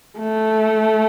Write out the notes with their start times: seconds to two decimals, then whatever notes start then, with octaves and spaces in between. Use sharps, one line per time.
0.18 A3